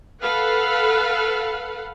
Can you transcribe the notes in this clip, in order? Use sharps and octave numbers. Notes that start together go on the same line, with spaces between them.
A4 B4 F5 F#5